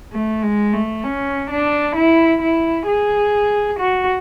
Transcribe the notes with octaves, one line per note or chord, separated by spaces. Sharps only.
A3
G#3
A3
C#4
D4
E4
E4
G#4
F#4